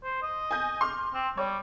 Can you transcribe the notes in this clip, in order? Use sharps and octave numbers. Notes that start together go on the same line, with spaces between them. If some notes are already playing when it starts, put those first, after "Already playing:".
C5
D#5
G#5 G6 A#6
C6 D6 F6
C4
G3 C#5